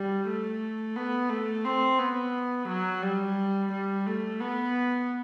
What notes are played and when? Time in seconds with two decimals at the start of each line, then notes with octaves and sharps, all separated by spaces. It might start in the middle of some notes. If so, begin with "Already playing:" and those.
Already playing: G3
0.27 A3
0.96 B3
1.30 A3
1.64 C4
1.99 B3
2.68 F#3
3.03 G3
3.72 G3
4.07 A3
4.41 B3